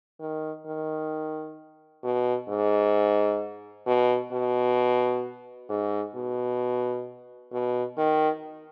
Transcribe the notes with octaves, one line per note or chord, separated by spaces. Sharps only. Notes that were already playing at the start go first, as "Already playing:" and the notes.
D#3
D#3
B2
G#2
B2
B2
G#2
B2
B2
D#3